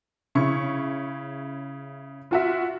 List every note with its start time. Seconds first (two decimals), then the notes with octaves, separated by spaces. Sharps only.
0.35 C#3 E4 C#6
2.31 F4 F#4 E5